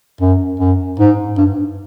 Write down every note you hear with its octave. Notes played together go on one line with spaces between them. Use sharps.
F#2
F#2
G#2
G2